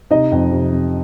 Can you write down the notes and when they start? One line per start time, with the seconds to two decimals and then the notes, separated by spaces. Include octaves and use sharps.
0.11 C3 D#4 D#5
0.32 F2
0.52 C3
0.72 C3